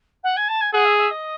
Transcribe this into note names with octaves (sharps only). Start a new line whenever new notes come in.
F#5
G#5
A5
G#5
G#4 F#5
E5
E5
D#5